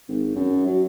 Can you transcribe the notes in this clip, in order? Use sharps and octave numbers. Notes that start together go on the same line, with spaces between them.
G#1
F#2
F#3